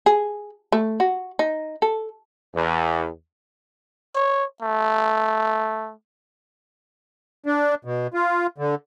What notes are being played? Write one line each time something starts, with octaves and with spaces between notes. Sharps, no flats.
G#4
A3
F#4
D#4
A4
E2
C#5
A3
D4
B2
F4
D3